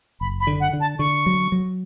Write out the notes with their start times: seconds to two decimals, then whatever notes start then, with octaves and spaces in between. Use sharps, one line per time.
0.21 F#1 B5
0.40 B5
0.47 D3
0.60 F#5
0.73 D3
0.80 A5
0.99 D3 C#6
1.26 F#3
1.52 F#3